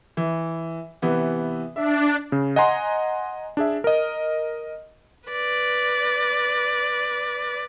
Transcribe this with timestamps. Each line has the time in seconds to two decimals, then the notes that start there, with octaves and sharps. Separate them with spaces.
0.17 E3
1.02 C3 E3 B3
1.76 D4 E5
2.32 C#3
2.56 D#5 F#5 G#5 A#5 C6
3.57 D4 G#4 E5
3.84 A#4 D#5
5.28 B4 D5